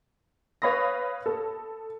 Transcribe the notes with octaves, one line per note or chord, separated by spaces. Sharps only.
B4 C#5 F5 B5 D#6 A#6
A4